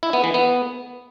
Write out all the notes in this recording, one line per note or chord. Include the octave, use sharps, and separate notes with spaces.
E4
B3
E3
B3